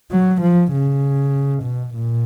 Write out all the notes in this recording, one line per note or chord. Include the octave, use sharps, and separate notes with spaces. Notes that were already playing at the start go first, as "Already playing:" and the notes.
F#3
F3
C#3
B2
A#2